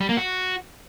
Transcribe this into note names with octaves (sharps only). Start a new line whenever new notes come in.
G3
A#3
F#4